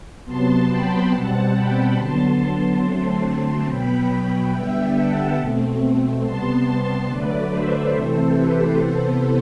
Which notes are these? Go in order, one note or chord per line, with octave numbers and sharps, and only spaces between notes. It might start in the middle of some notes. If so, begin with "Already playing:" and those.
C3 F#3 B3 A5 C6
G5 B5
B2 G3 C4 F#5 A5
G5 B5
D3 F#3 B3 A5 C6
D3 F#3 A3 C4 A5 C6
B2 F#3 B3 G5 B5
D3 G3 B3 E5 G5
F#5 A5
B2 A3 C4
C3 G3 B3 A5 C6
A5 C6
D3 F#3 A3 B4 D5
C5 E5
C3 E3 A3 C4 A4 C5
G4 B4
C3 E3 B3 A4 C5